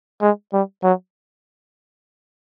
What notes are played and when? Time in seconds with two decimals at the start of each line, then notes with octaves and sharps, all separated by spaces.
0.22 G#3
0.53 G3
0.83 F#3